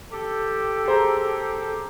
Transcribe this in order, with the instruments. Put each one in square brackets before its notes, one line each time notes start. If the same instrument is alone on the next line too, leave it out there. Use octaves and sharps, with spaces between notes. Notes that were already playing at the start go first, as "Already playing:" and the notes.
[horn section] G4 A4
[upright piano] G#4 C5 A#5